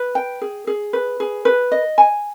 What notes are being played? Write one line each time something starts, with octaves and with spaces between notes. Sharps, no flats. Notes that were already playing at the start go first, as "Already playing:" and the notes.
Already playing: B4
G5
G#4
G#4
B4
G#4
B4
D#5
G#5